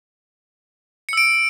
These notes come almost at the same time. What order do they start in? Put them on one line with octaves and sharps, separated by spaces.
C#7 E6 D7